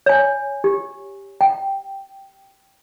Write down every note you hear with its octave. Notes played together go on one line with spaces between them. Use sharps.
C#5 G#5
G4
G5